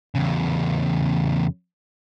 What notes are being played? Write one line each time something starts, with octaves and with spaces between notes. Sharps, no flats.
E2 C#3